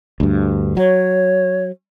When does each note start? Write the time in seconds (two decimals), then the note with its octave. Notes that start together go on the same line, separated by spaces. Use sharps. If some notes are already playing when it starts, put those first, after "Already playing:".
0.20 D2 G2
0.77 F#3 C#5